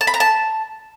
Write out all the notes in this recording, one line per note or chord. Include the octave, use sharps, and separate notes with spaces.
A5
B5
A#5
A5